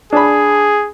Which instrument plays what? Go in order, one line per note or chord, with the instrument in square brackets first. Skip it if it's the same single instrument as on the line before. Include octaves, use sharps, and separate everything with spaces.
[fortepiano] D4 B5 [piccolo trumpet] G#4